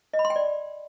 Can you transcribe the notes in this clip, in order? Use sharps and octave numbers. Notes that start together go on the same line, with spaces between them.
D#5
B5
C6
G5
D5